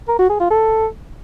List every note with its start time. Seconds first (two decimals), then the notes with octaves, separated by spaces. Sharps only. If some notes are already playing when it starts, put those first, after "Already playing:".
0.08 A#4
0.19 F#4
0.30 G#4
0.40 F4
0.51 A4